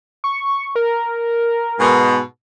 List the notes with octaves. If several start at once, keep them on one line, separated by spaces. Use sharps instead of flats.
C#6
A#4
G#2 B2